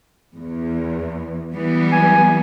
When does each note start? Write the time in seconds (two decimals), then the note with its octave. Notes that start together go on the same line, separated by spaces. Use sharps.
0.37 E2
1.52 E3 G3 B3
1.92 G#5